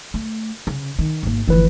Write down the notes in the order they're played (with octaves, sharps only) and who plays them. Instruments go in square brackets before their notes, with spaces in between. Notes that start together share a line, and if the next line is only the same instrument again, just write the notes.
[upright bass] A3
C#3
D#3
G#1 A#3
[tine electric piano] G1 E3 B4 [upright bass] D2 F3